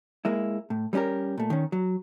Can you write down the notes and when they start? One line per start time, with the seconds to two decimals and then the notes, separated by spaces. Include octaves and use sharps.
0.25 G#3 A#3 E4
0.70 A2
0.93 G3 B3 C#4 G4 A#4
1.37 A#2 A3
1.50 D#3 C#4
1.72 F#3